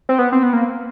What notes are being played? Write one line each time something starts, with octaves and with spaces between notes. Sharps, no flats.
C4
B3
C4
B3
A#3